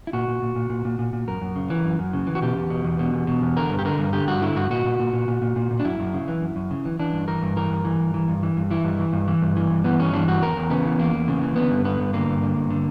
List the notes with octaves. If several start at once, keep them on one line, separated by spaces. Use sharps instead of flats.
E4
A#2 F#4
A#2
A#2
A#2
A#2
A#2
A#2
A#2
F#2 A#4
F#2
C#3
E3
F#2
F#2
C#3
E3
F#4
B2 G4
E2
B2
E2
B2
E2
B2
E2
D3 A#4
G2
G4
D3 A#4
G2
D3 G4
G2 F#4
D3 E4
G2 F#4
A#2 F#4
A#2
A#2
A#2
A#2
A#2
A#2
A#2
D4
F#2 E4
F#2
C#3
E3
F#2
F#2
C#3
E3
E3 D4
G2
E3 A#4
G2
E3 A#4
G2
E3
G2
E3
G2
E3
G2
E3 E4
G2
E3
G2
E3
G2
E3
G2
E3 B3
G2 C#4
E3 D4
G2 F#4
E2 A#4
E2
C#3 B3
E3
E2 A#3
E2
C#3
E3
D3 B3
G2
D3 B3
G2
D3 A#3
G2
D3
G2
D3